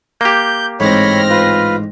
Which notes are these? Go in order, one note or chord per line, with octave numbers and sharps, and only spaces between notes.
A#3 G4 G6
A1 G#2 C4 C#5 B5 F6 A#6
F4 B4